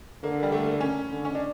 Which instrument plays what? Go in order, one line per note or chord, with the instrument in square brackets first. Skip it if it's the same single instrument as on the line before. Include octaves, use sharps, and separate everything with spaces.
[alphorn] D3 [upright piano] A#3
[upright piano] G3
A3
A#3
C#4
[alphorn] D3
[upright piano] C#4
D4